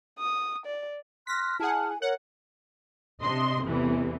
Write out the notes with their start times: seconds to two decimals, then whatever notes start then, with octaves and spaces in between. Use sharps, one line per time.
0.20 D#6
0.66 D5
1.27 C6 F6 F#6 A#6 B6
1.60 E4 G#4 F#5 G#5 A5 F6
1.89 G#5
2.02 A#4 C#5 F#5
3.22 C3 D4 D#5 C6
3.63 A1 E2 C3 E3